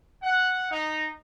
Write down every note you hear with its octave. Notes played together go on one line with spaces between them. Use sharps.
F#5
D#4